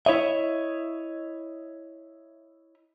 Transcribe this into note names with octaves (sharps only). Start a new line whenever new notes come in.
E4 C#5 D#5 E5